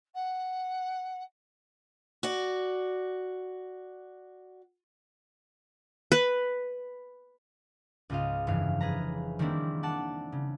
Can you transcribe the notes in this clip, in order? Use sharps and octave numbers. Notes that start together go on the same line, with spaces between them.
F#5
F#4 D5
B4
C#2 G#2 F4 D#5 F5
F1 G2 C#3 E3 F5 C7
G#4 B4 A#5
D#3 G3 A#3 C4 D4 E4
D5 F#5 A5
C#3